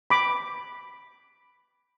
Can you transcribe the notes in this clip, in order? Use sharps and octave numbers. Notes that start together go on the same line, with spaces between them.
B5 D6